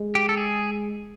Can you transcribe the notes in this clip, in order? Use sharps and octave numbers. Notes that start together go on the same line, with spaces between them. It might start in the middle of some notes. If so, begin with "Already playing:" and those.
Already playing: G#3
G4
A4
G#4